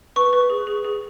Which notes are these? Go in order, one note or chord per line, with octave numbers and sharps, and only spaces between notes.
B4 C#6
B4
G#4
G#4
G#4